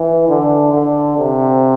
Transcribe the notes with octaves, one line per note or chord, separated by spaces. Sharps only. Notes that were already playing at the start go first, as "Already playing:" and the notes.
Already playing: E3
D3
D3
C3